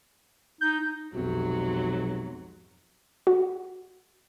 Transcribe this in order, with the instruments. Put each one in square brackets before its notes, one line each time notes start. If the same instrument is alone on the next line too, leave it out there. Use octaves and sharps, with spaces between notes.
[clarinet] D#4 [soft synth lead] G6
[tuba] B1 [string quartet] F2 G#2 F#3 [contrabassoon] C3
[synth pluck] F#4